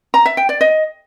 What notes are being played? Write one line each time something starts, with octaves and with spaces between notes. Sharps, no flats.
A#5
E5
G5
D5
D#5